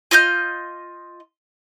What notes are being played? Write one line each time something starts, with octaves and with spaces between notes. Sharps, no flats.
F4 D#5 F6 G6